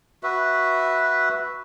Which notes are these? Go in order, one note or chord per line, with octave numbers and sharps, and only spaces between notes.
F#4 B4 E5